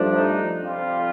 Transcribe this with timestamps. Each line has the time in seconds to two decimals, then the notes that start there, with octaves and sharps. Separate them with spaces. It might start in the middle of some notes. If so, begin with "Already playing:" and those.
Already playing: G2 F3 A3 D4
0.14 D#4
0.63 F2 C3 G3 F4